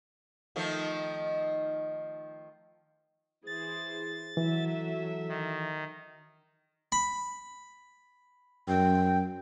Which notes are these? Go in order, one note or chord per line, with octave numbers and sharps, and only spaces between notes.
D#3 F3 A3
E3 G#4 C5 A6
E3 F#3 A4 E5
D#3
B5
F#2 G5